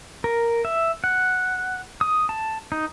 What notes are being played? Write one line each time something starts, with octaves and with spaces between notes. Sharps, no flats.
A#4
E5
F#5
D#6
A5
D#4